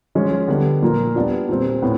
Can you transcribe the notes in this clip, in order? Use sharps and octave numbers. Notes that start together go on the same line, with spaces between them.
F3 G#3 C#4 F4
D3 G3 B3
A#2 F3 A#3
G3 B3 D4 F4
A#2 G3 C4
A2 B3